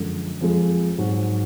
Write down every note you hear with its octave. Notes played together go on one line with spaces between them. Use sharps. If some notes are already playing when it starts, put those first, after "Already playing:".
Already playing: F#2 D3 F3 G#3
F2 F3 G#3
G#2 F#3